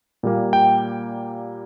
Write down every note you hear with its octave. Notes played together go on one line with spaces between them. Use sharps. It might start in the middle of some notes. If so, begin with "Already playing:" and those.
A#2 G3 A#3
G5